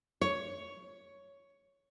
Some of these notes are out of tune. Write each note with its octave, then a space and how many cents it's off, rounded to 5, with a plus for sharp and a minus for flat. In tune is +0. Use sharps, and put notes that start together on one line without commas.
C#5 +5